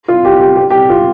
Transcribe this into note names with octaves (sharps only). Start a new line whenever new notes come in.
F4
G4
G4
G4
G4
F4